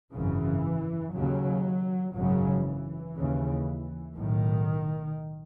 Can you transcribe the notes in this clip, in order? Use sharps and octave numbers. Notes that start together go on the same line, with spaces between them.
G#1 F#2 C#3 E3
D#2 C#3 F#3
G#1 F#2 C#3 F#3
E3
D#2 C#3
B1 A2 D#3